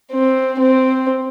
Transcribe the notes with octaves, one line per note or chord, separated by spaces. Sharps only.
C4
C4